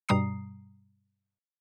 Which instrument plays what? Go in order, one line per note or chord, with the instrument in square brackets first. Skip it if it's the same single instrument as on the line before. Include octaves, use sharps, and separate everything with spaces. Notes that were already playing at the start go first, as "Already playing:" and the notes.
[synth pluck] G2 B2 G3 A#5 D#6 C7